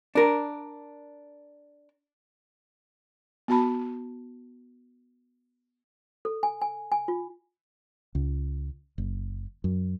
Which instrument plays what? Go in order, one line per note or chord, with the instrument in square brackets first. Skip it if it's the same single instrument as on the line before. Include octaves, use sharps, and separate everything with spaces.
[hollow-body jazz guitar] D4 A#4
[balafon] B3 F#4 A5 B5
[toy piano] A4
G#5
G#5
G#5
F4
[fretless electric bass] C#2
F#1
F#2